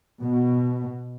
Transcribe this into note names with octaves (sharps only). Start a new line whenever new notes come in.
B2